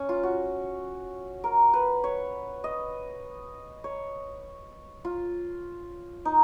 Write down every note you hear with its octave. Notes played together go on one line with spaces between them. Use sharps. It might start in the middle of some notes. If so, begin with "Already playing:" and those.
Already playing: C#4
F4
F#4
A#4
B4
C#5
D#5
C#5
F4
D#4